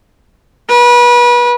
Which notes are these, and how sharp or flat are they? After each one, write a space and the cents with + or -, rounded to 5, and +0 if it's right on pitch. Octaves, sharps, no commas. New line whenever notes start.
B4 -30